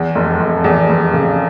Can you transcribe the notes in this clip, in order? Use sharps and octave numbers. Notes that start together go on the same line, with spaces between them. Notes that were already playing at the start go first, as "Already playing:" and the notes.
Already playing: E2
F1
F1
E2
F1
C#3